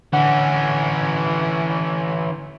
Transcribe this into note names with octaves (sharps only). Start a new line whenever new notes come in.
D3 E3 C#4 F#5